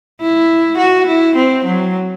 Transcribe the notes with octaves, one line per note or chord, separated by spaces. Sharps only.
E4
F#4
E4
C4
F#3